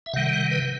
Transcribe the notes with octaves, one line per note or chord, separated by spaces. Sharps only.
E5
C3 D#3 G3 F#5
F#5
B4